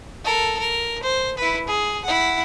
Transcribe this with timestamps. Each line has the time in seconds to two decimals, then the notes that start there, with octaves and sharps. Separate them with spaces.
0.24 A4 A#4
0.60 A#4
1.03 C5
1.38 E4 B4
1.67 G#4
2.05 E4 F#5